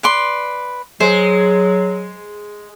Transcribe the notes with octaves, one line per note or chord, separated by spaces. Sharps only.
B4 D5 C6
F#3 G#3 C5